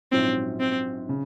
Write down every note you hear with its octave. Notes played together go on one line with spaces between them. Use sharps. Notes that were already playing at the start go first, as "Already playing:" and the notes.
A#1 G#2 F#3 C4 C#4 F4
C4
C#3